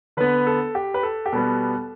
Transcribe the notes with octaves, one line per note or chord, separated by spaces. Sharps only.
D3 B3 B4
A4
G4
B4
A4
G4
B2 G3 B3 A4